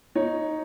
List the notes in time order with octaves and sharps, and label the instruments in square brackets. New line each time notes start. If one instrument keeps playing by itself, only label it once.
[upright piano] D#4 C#5